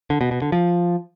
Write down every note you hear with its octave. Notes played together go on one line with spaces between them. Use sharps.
D3
B2
B2
D3
F3